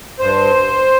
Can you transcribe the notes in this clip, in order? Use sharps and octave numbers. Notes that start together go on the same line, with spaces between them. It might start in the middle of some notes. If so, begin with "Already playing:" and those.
G2 C5